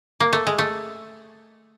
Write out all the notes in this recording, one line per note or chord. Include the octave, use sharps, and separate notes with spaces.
A#3
A3
G#3
A3